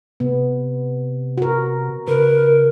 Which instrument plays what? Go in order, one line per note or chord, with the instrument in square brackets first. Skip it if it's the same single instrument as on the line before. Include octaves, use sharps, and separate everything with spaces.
[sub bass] C3 [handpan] B3
[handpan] F#4 A#4
[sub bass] C#3 [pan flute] A#4 [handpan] B4